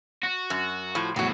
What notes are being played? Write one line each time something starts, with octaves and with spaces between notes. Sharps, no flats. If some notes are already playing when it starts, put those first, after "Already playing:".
F#4
F#2
A2 F3
E2 A2 F#3 F#4